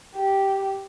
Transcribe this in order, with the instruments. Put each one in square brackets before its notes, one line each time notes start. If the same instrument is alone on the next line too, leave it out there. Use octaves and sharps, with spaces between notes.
[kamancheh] G4